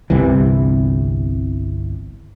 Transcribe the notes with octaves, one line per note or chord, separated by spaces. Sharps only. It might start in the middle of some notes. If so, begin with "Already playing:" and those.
G1 C2 C3 E3